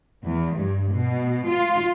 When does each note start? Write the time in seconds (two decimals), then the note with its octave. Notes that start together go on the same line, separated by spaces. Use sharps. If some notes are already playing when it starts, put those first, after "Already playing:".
0.24 E2
0.56 G2
0.92 B2
1.48 F4